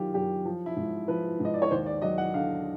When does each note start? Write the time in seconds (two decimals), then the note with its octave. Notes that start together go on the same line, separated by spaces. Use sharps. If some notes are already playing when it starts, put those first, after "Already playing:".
Already playing: F#2 D#3 F#3 F4 G4
0.14 F#2 G4
0.45 F3
0.66 E4
0.76 G#2
1.08 F3 B4
1.40 G#2 D#5
1.54 D5
1.62 C#5
1.71 D#2 C5
1.86 D5
2.02 F#3 D#5
2.18 F#5
2.34 D3 F5